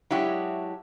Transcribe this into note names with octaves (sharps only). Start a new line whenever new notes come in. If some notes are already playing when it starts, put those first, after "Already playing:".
F#3 G#3 D4 E4 F#4 G4